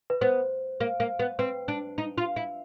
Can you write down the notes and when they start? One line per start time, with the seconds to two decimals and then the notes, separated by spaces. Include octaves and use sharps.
0.10 B4
0.21 B3 C5
0.80 A#3
1.00 A#3
1.19 B3
1.39 C4 B4
1.68 D4
1.98 D#4
2.18 F4
2.36 E4